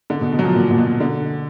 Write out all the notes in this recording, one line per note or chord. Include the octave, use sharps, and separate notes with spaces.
D3
B2
B2
F#3
F3
A#2
A#2
B2
D3